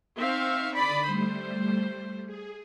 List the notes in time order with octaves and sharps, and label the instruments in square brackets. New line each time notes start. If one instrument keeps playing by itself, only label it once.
[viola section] C4 E5 F5 [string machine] D#4 C#6
[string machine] D3 D#6 [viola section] D5 B5
[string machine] G3 A3 [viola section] C5
[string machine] G#4